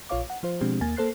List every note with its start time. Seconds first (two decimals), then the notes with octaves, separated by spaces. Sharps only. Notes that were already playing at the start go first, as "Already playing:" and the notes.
0.09 A#1 F4 C#5 F5 D6
0.30 F#5
0.43 F3 F4 C5
0.61 B2 F3 G#3 C4 D4 G4
0.81 D#2 A#3 G#5 A6
0.97 A#3 A4 C5 F#6 C7